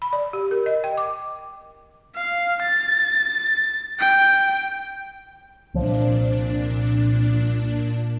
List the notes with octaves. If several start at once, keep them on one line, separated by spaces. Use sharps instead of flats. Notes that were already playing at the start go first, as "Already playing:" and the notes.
B5
D5
G4
A#4
D#5
G5
D6
F5
A6
G5
C2 A#2 F3 D4